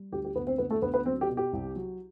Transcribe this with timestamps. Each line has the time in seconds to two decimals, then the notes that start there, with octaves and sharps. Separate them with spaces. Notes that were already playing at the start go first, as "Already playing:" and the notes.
Already playing: G3
0.12 D2 G4
0.24 G4
0.35 D2 B3 B4
0.47 C4 C5
0.58 D2 B3 B4
0.70 A3 A4
0.82 D2 B3 B4
0.94 B3 B4
1.06 F#3 C4 C5
1.21 G4
1.29 B2
1.37 G4
1.53 C2
1.76 F#3